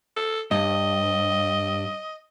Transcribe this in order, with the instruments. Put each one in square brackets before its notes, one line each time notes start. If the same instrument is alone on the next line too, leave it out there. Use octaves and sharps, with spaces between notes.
[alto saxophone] A4
[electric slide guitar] G2 [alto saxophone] D#5